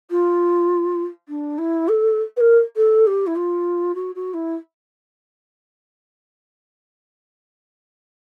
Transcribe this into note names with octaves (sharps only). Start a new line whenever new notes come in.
F4
D4
E4
A4
B4
A#4
A4
G4
E4
F4
F#4
F#4
E4